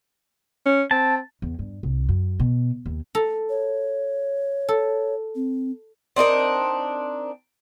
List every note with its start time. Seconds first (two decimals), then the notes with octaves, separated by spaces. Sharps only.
0.66 C#4
0.91 C4 A5
1.42 E2
1.59 G2
1.83 C2
2.09 F#2
2.39 B2
2.86 D#2
3.15 A4 A#5
3.50 C#5
4.69 A4
5.35 C4
6.16 C4 D4 D#4 A#4